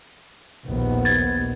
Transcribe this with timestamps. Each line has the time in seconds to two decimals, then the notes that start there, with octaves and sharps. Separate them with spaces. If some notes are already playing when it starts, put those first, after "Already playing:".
0.68 A#1 D#2 B3
1.05 G#6 A6